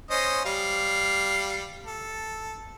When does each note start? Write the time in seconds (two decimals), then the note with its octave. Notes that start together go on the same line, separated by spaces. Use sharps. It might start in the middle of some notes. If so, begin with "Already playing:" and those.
0.10 C#4 C5 D#5
0.45 G3 F5
1.86 A4